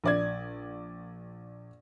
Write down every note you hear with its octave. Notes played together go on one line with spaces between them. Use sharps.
A#1 D5 G#6